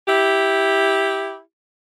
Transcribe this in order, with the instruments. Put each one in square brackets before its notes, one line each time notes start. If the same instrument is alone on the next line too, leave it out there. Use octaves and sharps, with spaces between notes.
[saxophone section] E4 G4